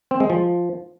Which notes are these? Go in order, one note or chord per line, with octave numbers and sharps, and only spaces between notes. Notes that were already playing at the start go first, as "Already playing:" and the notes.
C4
G#3
F3